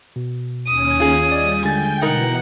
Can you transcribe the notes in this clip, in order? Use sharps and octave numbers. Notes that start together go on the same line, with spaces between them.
B2
D#2 C#4 G#5 D#6
F4 G#4
G3 D5 D#5
D3 G#3 G5 G#5 A6
B2 E3 D#4 A#4 F#5